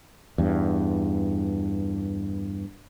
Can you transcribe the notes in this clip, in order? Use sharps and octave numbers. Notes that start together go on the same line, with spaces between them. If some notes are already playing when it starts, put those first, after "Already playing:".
E2 G2